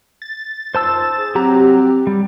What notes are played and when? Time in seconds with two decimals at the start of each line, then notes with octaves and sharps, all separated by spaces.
0.22 A6
0.75 F#2 D#4 F4 C5 A5 E6
1.17 G#4
1.35 F#3 C4 G4 A#5
2.07 G3